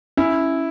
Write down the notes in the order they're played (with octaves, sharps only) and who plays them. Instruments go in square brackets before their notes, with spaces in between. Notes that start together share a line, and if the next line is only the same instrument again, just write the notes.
[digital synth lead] C#4 [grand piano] E4